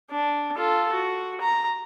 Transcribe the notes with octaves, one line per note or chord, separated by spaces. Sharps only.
D4
F4 A4
F#4
A#5